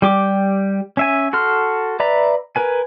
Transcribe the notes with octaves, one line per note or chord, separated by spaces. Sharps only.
G3 G4 D6
C#4 E5 G#5
F#4 A4 C6 F6
B4 D5 E5 A#5
A#4 B4 G#5